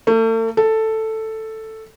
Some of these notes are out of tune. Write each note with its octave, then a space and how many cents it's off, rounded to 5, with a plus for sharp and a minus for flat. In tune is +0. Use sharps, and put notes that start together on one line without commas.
A3 +40
A4 +5